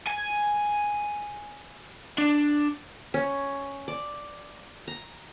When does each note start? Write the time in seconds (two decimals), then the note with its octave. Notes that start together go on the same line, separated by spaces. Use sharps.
0.07 G#5
2.18 D4
3.14 C#4
3.88 D5
4.88 A#5